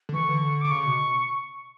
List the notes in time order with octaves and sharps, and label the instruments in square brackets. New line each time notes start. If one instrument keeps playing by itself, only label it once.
[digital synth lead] D3
[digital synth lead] E3 [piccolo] C#6
[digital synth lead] D3
[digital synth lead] D3 [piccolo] D6
[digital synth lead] C#3 [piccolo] C#6
[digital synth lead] B2